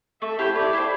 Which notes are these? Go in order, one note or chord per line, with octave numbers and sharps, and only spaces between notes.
A3 E5
E4 G4 C5
A3 D5
E4 G4 C5